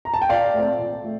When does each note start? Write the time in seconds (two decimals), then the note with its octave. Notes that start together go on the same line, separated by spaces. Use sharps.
0.05 A#5
0.14 A5
0.22 G5
0.29 A#2 D5 F5
0.54 A3 C4
0.79 A#2
1.04 A3